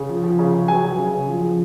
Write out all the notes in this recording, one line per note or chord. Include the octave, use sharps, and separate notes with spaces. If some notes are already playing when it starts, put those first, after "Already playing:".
Already playing: C#3
F3
F3
C#3
C#3
F#3 G#5
F#3
C#3
C#3
F3
F3